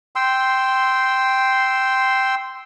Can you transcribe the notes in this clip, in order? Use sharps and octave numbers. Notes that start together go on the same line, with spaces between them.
G5 C6 E6